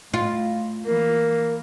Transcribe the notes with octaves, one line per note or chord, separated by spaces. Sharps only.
A2 F4
E3 A#3 A#4